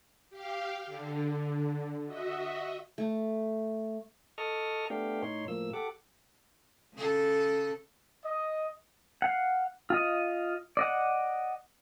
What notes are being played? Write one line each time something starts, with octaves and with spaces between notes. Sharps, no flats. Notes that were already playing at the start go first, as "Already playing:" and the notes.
G4 F5
D3
F#4 D#5 E5
A3
A4 D#5 A5 C#6 D#6 F6
A3 B3 D4 G4 F5 G5
A2 D#4 C#5 C6
A2 F3 A#3 E6
G4 A4 F#5 D6
C#3 A4
D#5
F5 F#5
F4 D#5
D5 D#5 F#5